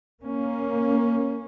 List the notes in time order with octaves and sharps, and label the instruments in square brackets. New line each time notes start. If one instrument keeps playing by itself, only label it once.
[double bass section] A#3 C#4